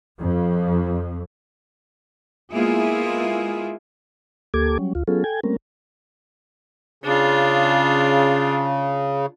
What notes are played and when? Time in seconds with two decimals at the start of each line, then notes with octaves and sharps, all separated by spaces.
0.18 F2
2.52 G#3 A#3 B3 E4 F4 G#4
4.54 D2 A#3 G4 A4 D6 G#6
4.79 F#3 G3 C#4
4.95 D2 F4
5.08 F#3 B3 C#4 F4 G#4 A4
5.24 A4 G5 G#5 G#6
5.43 G3 A3 A#3 C4 C#4 A#4
7.04 C#3 D4 F4